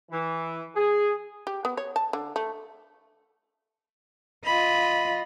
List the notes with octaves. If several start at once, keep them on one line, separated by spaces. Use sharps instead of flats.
E3
G#4
G4
B3
C#5
A5
D3
A3
F4 D#5 B5